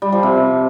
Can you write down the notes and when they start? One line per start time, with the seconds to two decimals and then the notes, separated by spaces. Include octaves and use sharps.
0.02 G3
0.12 F3
0.23 C3